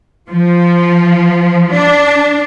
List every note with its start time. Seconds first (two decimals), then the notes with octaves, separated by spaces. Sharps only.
0.29 F3
1.72 D4